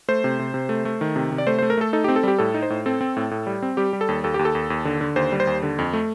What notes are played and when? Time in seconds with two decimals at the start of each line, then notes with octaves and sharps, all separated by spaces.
0.08 A3 C5
0.24 C3
0.39 C3
0.54 C3
0.69 A3
0.85 A3
1.01 D#3
1.16 C3
1.32 C3
1.38 D5
1.47 A3 C5
1.58 C5
1.62 A3
1.70 A#4
1.77 A3 A4
1.93 D#4 A4
2.04 G4
2.08 C4
2.16 A4
2.23 G3 G4
2.38 A2 A4
2.54 D#4
2.62 C5
2.70 A2
2.86 C4 A4
3.01 C4
3.17 A2
3.31 A2
3.47 G3
3.62 C4
3.77 G3 G4
3.93 G3
4.01 A4
4.09 D#2
4.24 D#2 A4
4.34 D#2 G4
4.45 A4
4.55 D#2
4.70 D#2
4.85 D3
5.01 D3
5.16 D#2 C5
5.32 G3
5.40 C5
5.47 D#2
5.63 D3
5.79 F2
5.93 A3